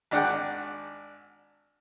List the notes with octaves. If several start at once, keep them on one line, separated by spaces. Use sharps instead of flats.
G#1 D4 F#5 G5